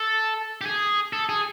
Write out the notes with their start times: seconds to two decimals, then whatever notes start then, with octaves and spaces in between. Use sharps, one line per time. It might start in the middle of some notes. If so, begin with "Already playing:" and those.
Already playing: A4
0.61 G4
0.66 G#4
1.13 A4
1.29 G#4